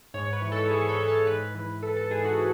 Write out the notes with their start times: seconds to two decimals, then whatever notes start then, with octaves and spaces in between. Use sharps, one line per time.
0.14 G#2 C#5
0.33 B4
0.42 E3
0.52 A4
0.70 E3 G#4
0.89 A4
0.98 G#2
1.08 A4
1.26 G#2 B4
1.55 E3
1.83 E3 A4
1.97 A4
2.10 G#2 G#4
2.25 F#4